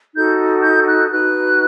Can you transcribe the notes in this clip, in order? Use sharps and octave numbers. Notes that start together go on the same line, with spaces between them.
D#4 F#4 A4 G6
G6
F#6
D#4 F#4 B4 F#6